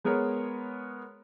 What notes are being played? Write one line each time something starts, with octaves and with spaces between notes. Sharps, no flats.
G#3 B3 G#4 A#4 C#5